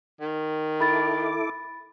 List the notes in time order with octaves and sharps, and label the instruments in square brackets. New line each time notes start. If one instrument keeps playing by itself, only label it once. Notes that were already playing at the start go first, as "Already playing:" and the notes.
[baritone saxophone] D#3
[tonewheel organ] E4 A4 D6 [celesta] B5 A6